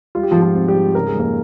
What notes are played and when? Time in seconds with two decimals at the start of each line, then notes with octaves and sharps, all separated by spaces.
0.15 G3 F4
0.23 G4
0.31 F3 F4
0.35 G#2
0.42 F3 F4
0.55 C4
0.68 G3 G4
0.75 G#2
0.94 C#3 A#4
1.07 G#4
1.15 F2 A#3 A#4